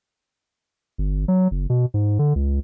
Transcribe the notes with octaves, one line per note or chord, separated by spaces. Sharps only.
G1
F#3
F#1
B2
G#2
D3
C#2